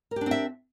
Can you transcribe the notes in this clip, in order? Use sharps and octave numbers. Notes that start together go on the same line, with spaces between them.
C4 D4 G4 A#4 E5